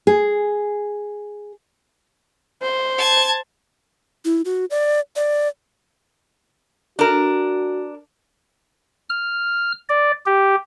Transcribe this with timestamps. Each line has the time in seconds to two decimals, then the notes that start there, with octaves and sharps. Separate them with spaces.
0.07 G#4
2.63 C5
2.98 A5 G#6
4.25 E4
4.45 F#4
4.70 D5
5.16 D5
6.99 D4 F#4 A#4
9.10 F6
9.89 D5
10.26 G4